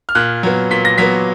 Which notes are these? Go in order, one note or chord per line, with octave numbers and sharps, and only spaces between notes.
F6
A#2 F#6
F#3 B3
A#2 B6
A#6
F#3 B3 B6